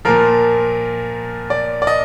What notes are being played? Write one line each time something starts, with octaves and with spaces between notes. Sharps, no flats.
A#2 F3 A#4
D5
D5
D#5